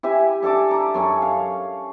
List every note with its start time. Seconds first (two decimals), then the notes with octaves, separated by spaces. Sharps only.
0.03 E4 G4 E5 G#5
0.43 D4 A4 G#5 D6
0.71 A#5 D6
0.94 F#2 C#4 A4
1.22 F5